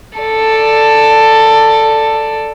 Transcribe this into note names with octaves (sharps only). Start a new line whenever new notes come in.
A4 D5